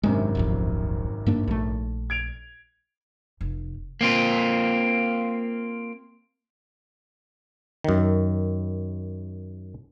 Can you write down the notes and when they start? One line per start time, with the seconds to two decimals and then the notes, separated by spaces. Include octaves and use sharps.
0.03 G#1 F#2 C3 G#3 C4 D4
0.35 D1 A#1 F2
1.26 G2 A#3 D4
1.47 A#1 A3
2.10 G#6 D7 F7
3.41 F1
4.01 A#3 C4 F4
7.84 F#2 D#3